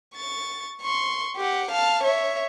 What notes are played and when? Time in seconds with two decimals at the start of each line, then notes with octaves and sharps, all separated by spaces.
0.16 C#6 A6
0.82 C6 C#6
1.36 G4 F#5
1.71 F5 A5
2.03 C#5 E5